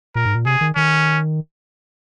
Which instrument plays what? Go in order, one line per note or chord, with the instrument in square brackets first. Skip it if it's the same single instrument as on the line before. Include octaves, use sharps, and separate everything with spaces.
[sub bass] A#2 [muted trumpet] A#4
[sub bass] G#2
A#2
[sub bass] C3 [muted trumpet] G#4
[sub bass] D#3
[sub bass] D#3 [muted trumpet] C#4